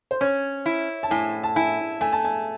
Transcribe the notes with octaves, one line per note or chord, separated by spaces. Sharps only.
C5
C#4 C#5
E4
A5
A2 G#5
A5
E4 G#5
A3 G#5
A5
G#5